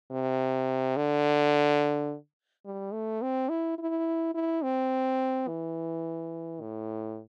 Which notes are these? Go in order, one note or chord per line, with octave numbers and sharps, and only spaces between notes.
C3
D3
G3
A3
C4
E4
E4
E4
C4
E3
A2